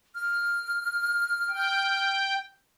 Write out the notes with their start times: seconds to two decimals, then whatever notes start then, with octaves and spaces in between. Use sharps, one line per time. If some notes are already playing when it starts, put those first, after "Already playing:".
0.15 F6
1.50 G5